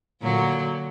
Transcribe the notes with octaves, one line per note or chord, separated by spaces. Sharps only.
A#2 D3 F#3